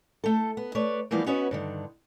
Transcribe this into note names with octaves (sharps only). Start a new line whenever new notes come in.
A3 A4
B3
A3 B4 C#5 D5
E3 F3 G3 A#3 B3
B3 C#4 F#4 B4 C#5 D#5
G2 D3 D#3